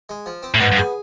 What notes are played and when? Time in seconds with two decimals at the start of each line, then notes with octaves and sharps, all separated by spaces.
0.09 G#3
0.26 F3
0.43 C4
0.55 A2
0.60 G#2 B3
0.72 G2
0.77 G#4